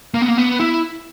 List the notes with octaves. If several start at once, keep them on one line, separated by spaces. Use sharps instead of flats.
A#3
B3
A#3
B3
E4